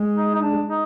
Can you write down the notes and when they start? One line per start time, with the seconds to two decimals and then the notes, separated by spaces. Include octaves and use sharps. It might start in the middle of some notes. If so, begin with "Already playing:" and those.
Already playing: G#3
0.16 D#4
0.34 D#4
0.42 D4
0.69 D#4